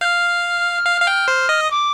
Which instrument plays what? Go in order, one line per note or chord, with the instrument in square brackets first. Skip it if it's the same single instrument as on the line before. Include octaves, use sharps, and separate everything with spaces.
[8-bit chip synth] F5 [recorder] G6
[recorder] F6
[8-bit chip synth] F5
F5
G5
C5
D#5
[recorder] D#6
D6